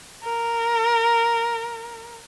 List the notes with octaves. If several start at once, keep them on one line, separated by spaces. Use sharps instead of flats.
A#4